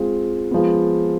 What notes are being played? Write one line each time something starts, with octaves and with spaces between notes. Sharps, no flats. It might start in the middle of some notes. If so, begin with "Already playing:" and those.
Already playing: G#3 C4 F4
F3 G#3 B3